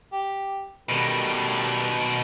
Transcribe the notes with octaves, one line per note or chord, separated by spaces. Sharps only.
G4
B2 D#3 G3 A4 B4